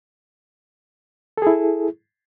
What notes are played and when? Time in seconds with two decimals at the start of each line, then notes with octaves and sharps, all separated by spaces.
1.38 A4
1.42 G#4
1.47 E4